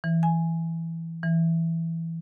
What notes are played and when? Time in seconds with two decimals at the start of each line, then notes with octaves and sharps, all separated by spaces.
0.04 E3
0.23 G#5
1.24 E3